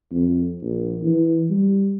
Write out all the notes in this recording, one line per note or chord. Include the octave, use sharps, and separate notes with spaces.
F2
A#1
E3
G3